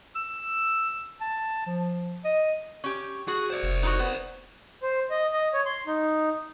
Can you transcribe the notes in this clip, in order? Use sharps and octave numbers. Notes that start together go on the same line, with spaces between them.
E6
A5
F3
D#5
C#4 G4
F#4 G#4
C5 D5
F1
D#4 E4 F#4
B3
C5
D#5
D#5
C#5
C6
D#4